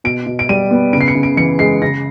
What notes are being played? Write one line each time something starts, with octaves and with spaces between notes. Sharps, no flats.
B2 D7
B2
D7
G3 D#7
B3
C#3 D7
C7
C#7
C#3
D7
E3 C#7
G#3 C7
C#3 A#6